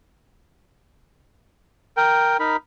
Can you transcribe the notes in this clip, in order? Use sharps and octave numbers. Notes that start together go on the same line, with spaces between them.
A#4 G5
D#4 A#4 B5